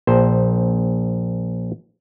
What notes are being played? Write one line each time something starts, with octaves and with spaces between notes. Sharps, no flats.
A#1 C5